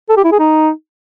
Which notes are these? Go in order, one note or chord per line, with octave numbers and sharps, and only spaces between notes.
A4
G4
E4
G#4
D#4